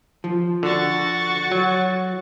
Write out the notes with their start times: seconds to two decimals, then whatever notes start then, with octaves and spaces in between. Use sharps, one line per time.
0.24 F3
0.63 D3 F#4 C#6 A6
1.52 F#3